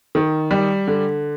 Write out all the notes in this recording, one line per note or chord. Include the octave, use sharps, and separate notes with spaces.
D#3
G3
D3